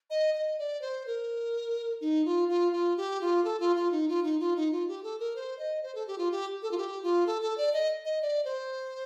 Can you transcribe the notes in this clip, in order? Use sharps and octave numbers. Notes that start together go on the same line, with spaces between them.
D#5
D#5
D5
C5
A#4
D#4
F4
F4
F4
G4
F4
A4
F4
F4
D#4
F4
D#4
F4
D#4
F4
G4
A4
A#4
C5
D#5
C5
A4
G4
F4
G4
A4
F4
G4
F4
A4
A4
D5
D#5
D#5
D5
C5